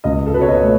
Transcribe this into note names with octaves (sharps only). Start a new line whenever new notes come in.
C#2 D#5
A4
B2 B4
C#5
D#5
A3